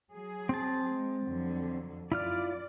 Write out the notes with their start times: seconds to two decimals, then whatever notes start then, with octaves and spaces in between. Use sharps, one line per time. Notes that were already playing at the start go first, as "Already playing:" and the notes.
0.12 F#3 G#4
0.49 C4 A5
0.91 G#3
1.26 F2 D3 F#3
2.12 F#2 E4 F4 D5 F6